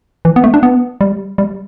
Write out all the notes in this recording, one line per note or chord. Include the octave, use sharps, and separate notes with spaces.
E3
B3
A3
D4
B3
G3
G3